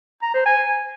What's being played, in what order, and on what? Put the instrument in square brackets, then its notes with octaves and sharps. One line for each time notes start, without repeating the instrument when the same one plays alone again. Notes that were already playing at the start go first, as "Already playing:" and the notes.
[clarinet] A#5
C5
G#5